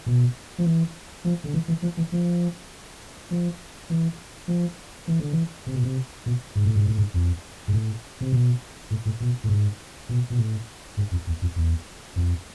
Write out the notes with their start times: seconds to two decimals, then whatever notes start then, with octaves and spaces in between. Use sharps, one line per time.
0.06 B2
0.58 F3
0.65 E3
1.25 F3
1.44 D3
1.54 E3
1.68 E3
1.82 F3
1.97 E3
2.12 F3
3.31 F3
3.90 E3
4.48 F3
5.08 E3
5.20 D3
5.33 E3
5.67 C3
5.74 B2
5.84 C3
6.26 B2
6.55 G#2
6.65 A2
6.76 G#2
6.87 A2
6.98 G#2
7.14 F2
7.68 G#2
7.73 A2
8.21 C3
8.32 B2
8.91 A2
9.05 A2
9.20 B2
9.44 A2
9.49 G#2
10.09 B2
10.30 B2
10.38 A2
10.97 G#2
11.11 F2
11.27 E2
11.42 F2
11.56 E2
12.16 F2